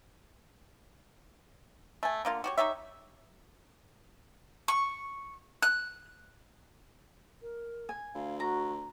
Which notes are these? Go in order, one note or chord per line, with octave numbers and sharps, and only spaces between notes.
A3 G#5
D3 A#3 F4
F#4 G4 C#5
D#4 G4 C#5 E5
C#6
F#6
A#4
G#5
D2 F5
F#4 A#5